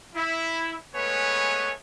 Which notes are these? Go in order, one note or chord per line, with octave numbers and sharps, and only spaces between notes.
E4
G#3 A3 B3 B4 C#5 G#5